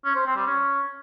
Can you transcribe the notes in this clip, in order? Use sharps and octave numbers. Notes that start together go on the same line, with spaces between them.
C#4
C5
C4
G3
C#4